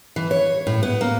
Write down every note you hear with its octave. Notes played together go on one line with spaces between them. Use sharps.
E3
C#5
A2
B3
A#3